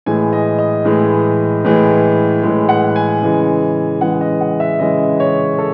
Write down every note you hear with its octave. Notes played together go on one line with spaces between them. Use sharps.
A2 E3 G#3 G#5
D#5
D#5
A2 E3 G#3
A2 E3 G#3
A2 E3 G#3
F#5
G#5
C#3 E3 G#3
C#3 E3 G#3 F#5
D#5
F#5
E5
C#3 E3 G#3 D#5
C#5
A4